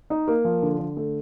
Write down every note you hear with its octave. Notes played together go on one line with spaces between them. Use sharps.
D#4
A#3
F3
D3
D3
A3